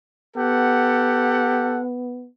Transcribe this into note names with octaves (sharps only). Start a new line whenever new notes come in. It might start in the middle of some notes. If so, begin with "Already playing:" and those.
B3 G4 A4 F#5